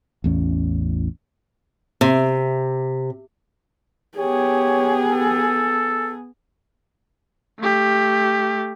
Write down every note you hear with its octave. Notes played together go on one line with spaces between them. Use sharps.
A1 E2 C#4
C3
B3 G4 G#4 C#5
A4
A3 G4